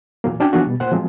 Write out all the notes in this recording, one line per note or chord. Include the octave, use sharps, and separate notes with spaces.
A#2 E3 F#3 A#3
C#4 D4 F#4 G5
E3 F3 A#3 B3 D4 F#4
B2 G3
A#2 C5 F#5
F3 F#3 G#3 C4